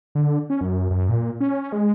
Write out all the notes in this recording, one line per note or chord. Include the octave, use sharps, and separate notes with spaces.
D3
C#4
F#2
F#2
A#2
C#4
G#3